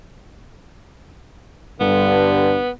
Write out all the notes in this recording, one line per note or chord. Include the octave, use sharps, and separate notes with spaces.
G2 D3 B3